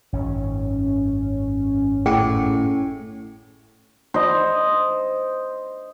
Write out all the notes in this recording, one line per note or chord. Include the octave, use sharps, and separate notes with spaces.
G#1 F#2 C#4
A2 G#4 F#5 G5
C5 D#5